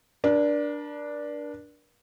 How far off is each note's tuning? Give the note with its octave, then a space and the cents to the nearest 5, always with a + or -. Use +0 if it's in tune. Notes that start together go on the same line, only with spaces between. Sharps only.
D4 +0 A#4 +45